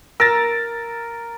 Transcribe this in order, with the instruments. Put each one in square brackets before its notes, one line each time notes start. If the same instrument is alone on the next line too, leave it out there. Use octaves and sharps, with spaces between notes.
[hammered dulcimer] A#4 [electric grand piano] E6 A6